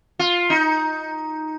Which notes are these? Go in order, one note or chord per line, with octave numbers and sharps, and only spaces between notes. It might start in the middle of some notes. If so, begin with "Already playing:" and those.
F4
D#4